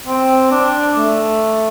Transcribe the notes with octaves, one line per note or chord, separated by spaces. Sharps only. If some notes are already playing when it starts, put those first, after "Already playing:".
C4
D4
A3